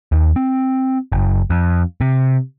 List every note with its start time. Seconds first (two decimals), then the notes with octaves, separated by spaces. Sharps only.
0.12 D#2
0.36 C4
1.12 F#1
1.50 F2
2.01 C3